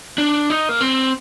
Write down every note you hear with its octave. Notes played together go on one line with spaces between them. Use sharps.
D4
D#4
A#3
C4